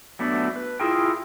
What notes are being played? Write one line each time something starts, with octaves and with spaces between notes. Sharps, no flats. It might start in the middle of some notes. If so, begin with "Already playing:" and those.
F#3 A3 B3 D4
B4
E4 F4 G#4 A#4 G5